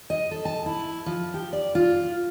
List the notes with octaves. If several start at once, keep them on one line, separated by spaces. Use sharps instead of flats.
D#5
A4
A5
E4
F3
G4
D5
F4